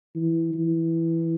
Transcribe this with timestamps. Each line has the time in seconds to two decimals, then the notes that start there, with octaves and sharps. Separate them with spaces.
0.16 E3
0.54 E3